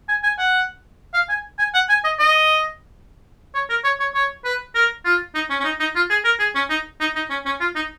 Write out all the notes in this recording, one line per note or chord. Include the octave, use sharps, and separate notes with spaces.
G#5
G#5
F#5
F5
G#5
G#5
F#5
G#5
D#5
D#5
C#5
A#4
C#5
C#5
C#5
B4
A#4
F4
D#4
C#4
C#4
D#4
D#4
F4
G#4
A#4
G#4
C#4
D#4
D#4
D#4
C#4
C#4
F4
D#4